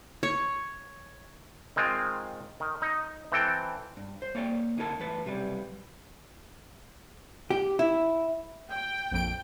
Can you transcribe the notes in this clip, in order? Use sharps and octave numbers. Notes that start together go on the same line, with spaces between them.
C#5
D#3 G#3 C4 D#4 F4
D#3
D#4
E3 C4 A4 G5
G2
C5
A#3 C#5 D5 F5 G5
D2 D#4 E4 G#4 A#4 A5
E2 A2 B4 A5
B1 C3 G3 B4 D5
G4
E4
G5
A#1 F2 D7